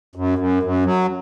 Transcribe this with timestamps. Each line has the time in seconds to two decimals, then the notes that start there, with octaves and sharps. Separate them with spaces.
0.16 F#2
0.38 F#2
0.63 F#2
0.85 F#3